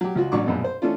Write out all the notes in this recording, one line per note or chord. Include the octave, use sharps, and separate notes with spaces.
F#3 G4
C#2 F4 F#4
A1 F#3 D4 C#6 D6
A#1 F#2 B2
C5
E3 A3 C#4 D4 F4